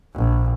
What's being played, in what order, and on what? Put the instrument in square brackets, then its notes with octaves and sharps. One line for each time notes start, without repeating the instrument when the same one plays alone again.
[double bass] A#1